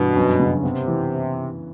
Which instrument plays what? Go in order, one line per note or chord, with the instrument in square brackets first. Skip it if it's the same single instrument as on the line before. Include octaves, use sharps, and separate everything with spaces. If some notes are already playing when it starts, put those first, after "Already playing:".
Already playing: [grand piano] G2 E3 [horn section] B2
[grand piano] F#2
C#3
[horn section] C3 [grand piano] B3
[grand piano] E3